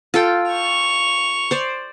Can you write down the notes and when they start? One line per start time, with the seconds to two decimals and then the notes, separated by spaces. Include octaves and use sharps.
0.14 F4 A4 G5
0.51 C#6 F7
1.51 C5 D5